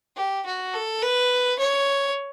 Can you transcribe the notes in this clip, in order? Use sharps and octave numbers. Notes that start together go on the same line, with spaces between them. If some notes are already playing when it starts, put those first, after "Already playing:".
G4
F#4
A4
B4
C#5